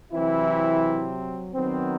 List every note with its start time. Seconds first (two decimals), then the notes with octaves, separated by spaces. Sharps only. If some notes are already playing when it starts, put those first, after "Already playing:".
0.13 C3 E3 F#3 C4 E4
1.54 D#3 F#3 B3 C4